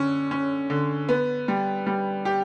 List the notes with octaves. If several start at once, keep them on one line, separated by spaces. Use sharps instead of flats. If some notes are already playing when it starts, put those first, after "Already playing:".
Already playing: D3 C#4
C#4
D3
B3
G3
G3
G4